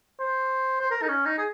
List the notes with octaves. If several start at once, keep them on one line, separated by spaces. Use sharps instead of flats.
C5
C5
A#4
D#4
C#4
D#4
G#4